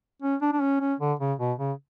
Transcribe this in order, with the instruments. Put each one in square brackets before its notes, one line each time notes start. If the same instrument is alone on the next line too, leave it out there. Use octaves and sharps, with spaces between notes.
[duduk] C#4
D4
D4
C#4
C#4
D3
C#3
B2
C#3